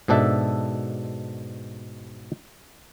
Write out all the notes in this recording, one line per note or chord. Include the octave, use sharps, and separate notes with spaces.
G#2 B2 D4 A4 E5